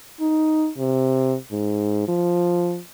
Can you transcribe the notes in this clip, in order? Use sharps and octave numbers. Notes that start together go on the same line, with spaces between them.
D#4
C3
G#2
F3